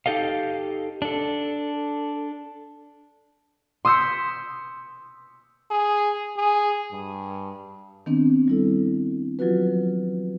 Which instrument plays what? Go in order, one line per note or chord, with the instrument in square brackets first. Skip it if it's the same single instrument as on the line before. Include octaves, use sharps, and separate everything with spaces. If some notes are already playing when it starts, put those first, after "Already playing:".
[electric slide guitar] D#4 G4 A4 D#5 F5
D4 A4
[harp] C6 D#6 E6 G6 B6 C#7
[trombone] G#4
G#4
G2
[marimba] D#3 B3 C4 D4
G3 E4 A4
F3 F#3 F4 F#4 B4